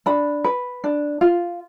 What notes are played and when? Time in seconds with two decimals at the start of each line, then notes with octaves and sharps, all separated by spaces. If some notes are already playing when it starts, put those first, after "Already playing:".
0.06 D4 B5
0.44 B4
0.84 D4
1.21 F4